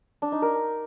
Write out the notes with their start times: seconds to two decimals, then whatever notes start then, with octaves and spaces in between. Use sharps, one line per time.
0.22 D4
0.32 D#4
0.42 A#4